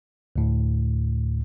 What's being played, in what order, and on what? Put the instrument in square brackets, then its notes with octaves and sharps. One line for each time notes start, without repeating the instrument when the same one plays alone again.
[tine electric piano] D2 A2